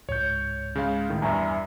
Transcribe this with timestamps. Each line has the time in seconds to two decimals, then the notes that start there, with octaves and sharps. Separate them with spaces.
0.09 C#2 G#2 C#5 G6
0.75 C#3 G#3 F5
1.09 A2 D#3
1.22 E2 G2 E5 G#5 A#5